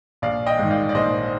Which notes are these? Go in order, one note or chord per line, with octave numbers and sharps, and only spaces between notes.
A#1 D5 F5
D#5 G5
G#2 D#3
D5 F5
D5
A#1 C5 D#5